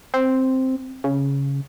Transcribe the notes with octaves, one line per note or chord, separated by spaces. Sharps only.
C4
C#3